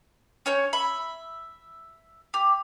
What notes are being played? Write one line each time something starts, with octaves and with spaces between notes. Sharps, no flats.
C#4 C#5 G6
E5 B5
G4